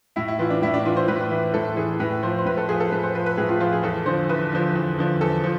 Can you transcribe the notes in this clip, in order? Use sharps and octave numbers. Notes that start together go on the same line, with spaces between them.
A2 E4
E4
E3 F4
D4
A2 E4
D4
E3 F4
C5
A2 B4
E3
A2 A4
E3 G#4
A2 B4
F3 C5
C5
A2 B4
A4
F3 G#4
A4
A2 B4
C5
F3 B4
B4
A2 G#4
F4
F3 F4
G#4
E2 A4
D3 F3 C5
E2 B4
D3 F3
E2
D3 F3
E2 A4
F3